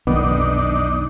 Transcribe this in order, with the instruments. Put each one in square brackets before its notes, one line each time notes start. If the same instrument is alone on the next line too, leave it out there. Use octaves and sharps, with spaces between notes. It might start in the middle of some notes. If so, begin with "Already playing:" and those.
[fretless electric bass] B1 [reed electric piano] F2 D#3 B3 [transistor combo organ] D4 D#4